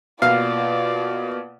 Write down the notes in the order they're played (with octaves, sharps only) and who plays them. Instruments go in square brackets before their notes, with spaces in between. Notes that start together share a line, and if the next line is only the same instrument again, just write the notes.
[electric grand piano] B2 A#3 [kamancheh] F4 D5 [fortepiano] F5